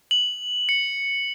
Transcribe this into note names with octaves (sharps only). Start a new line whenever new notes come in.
F#7
C#7